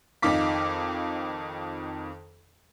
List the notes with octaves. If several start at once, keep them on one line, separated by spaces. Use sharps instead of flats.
F2 D#3 D#4 F5 D6 B6